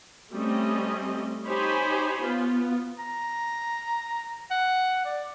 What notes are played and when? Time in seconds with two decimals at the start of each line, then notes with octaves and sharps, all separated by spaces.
0.33 G3 A3 C4 C#4 D#5
1.46 D#4 G4 C5 C#5 G#5 B5
2.22 B3 F4
2.99 A#5
4.50 F#5
5.05 D5